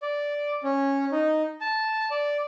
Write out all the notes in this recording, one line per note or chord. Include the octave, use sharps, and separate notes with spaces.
D5
C#4
D#4
A5
D5